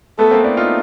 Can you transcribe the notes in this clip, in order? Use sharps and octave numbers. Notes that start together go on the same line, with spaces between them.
A3 B3 A4
A#3 C4
D4 E4
D#4 F4